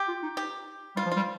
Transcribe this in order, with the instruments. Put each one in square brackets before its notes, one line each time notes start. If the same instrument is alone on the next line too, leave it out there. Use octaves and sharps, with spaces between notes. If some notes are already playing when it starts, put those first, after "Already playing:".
Already playing: [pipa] G4
[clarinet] F4
D#4
[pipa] G4
[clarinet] G3 [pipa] F4
[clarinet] F3
[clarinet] G3 [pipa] F4